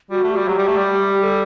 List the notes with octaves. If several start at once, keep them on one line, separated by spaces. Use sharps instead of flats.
G3 F#4
A3
G4
G3
F#3 G4
G3
A3
G3
A4